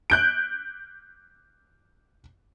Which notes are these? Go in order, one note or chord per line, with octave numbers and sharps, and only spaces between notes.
F#6 G6 D7